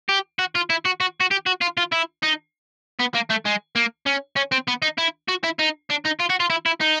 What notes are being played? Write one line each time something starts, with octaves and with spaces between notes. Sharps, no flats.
G4
F#4
F4
E4
F#4
F#4
F#4
G4
F#4
F4
F4
E4
D#4
B3
A#3
A3
G#3
A#3
C#4
C#4
C4
B3
D#4
E4
F#4
E4
D#4
D4
D#4
F4
F#4
F4
E4
E4
D#4